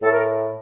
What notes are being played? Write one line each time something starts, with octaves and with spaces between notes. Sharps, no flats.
A2 A4
A#4